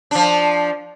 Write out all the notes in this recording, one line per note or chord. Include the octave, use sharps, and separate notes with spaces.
F3 D4